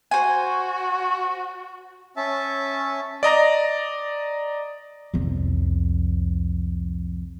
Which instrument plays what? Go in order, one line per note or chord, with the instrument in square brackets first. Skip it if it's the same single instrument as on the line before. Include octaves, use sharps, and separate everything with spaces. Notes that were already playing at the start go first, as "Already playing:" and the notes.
[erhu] F#4 [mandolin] C5 G#5
[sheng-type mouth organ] C#4 E5 A5
[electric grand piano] D5 D#5 A#5 A#6
[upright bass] C2 F2